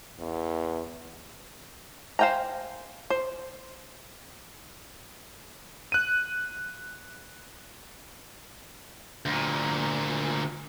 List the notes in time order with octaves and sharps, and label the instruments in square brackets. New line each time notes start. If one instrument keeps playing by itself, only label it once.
[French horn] E2
[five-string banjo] C5 F5 G5 G#5 A#5
C5
[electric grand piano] F#6 D#7
[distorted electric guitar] D2 A#2